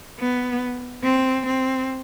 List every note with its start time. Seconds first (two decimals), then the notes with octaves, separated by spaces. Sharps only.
0.20 B3
1.04 C4
1.46 C4